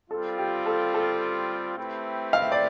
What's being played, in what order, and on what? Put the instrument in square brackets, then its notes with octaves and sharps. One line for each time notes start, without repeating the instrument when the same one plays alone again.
[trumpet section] G3 C4 F4 [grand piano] A4
[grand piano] G4
A4
A4
[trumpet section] A3 C4 E4 G4 B4
[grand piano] F5
E5
D5